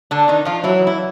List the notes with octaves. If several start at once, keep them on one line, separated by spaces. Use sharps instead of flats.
D3 D4
D#3 D#4
F3 F4
E3 F#3 E4
E4